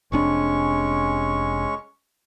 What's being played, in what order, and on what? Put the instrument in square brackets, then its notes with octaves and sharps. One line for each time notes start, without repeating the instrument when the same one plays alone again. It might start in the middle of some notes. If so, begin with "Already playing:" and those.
[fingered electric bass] F1 C3 D4 [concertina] G#3 C#4 C#6